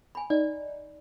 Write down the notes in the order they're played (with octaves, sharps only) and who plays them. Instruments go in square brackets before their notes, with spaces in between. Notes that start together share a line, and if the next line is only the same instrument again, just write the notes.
[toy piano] G#5 B5
[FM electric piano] D#4 [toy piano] D5